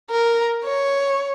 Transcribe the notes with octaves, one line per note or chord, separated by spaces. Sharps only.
A#4
C#5